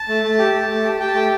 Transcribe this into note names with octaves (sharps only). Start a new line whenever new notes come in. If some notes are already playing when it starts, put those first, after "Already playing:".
Already playing: A5
A3
A3
G4
A3
A3
G4
G4 G5
A5
A3 G5